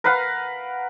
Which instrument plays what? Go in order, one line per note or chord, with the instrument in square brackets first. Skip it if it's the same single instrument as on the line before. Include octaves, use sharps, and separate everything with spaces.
[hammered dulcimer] A#4 B4 F5 F#5